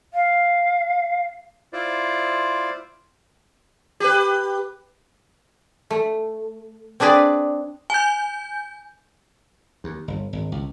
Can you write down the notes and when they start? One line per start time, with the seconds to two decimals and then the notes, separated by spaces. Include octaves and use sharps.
0.14 F5
1.73 E4 F4 C5 D5
4.00 G4 B4
5.90 A3
7.00 C4 D4 G#4 B4 D5
7.90 G#5 G6
9.84 D#2
10.08 G1
10.33 G#1
10.52 C#2